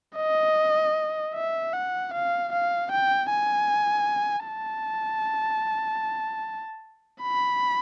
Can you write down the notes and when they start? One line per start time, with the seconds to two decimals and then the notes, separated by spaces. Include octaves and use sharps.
0.16 D#5
1.34 E5
1.73 F#5
2.14 F5
2.52 F5
2.91 G5
3.30 G#5
4.48 A5
7.22 B5